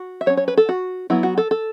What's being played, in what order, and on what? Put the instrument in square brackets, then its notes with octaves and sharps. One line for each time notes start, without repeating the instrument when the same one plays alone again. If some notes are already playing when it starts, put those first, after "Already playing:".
Already playing: [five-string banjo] F#4
E5
F#3 C#5
C#4
C#5
B4
A4
F#4
F#3 B3 E4
F#4
A4
A4